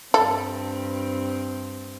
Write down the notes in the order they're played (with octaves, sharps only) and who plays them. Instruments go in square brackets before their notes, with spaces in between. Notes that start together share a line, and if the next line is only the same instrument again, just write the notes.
[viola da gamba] G2 C4 [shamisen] A4